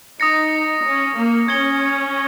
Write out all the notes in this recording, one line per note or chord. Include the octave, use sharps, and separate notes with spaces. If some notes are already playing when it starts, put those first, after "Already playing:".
D#4 D#6 A#6 C#7
C#4
A#3
C#4 G#6 C#7 G7